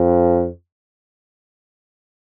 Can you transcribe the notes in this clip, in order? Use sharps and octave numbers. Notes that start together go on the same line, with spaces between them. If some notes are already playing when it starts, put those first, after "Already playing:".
Already playing: F2